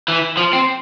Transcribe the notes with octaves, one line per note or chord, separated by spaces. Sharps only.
E3
F3
C4